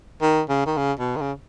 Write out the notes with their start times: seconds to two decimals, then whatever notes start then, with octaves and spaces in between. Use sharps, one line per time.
0.22 D#3
0.49 C#3
0.66 D#3
0.77 C#3
1.00 B2
1.16 D#3
1.21 C#3